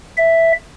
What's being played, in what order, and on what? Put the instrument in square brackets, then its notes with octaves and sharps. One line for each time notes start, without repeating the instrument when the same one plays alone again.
[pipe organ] E5